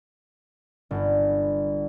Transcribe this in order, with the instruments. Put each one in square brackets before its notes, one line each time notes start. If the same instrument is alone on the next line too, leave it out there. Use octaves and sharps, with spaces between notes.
[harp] G1